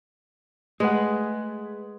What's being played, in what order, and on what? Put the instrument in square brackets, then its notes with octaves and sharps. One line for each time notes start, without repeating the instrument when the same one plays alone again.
[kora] G#3 [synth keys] A3 [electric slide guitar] G#4 B4 F#5